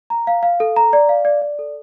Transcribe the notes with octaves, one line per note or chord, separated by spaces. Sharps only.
A#5
F5
F5
A4
A#5
D5
F5
D5
D5
A4